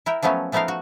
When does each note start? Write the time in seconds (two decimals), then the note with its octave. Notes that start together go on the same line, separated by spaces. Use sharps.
0.06 E4 A#4 G5
0.23 F3 F#3 A3 B3 C#4
0.52 F3 A3 B3 D#4 A#4 F5
0.68 F#4